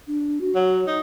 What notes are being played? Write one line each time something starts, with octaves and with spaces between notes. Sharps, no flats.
D4
F#4
F#3
D#4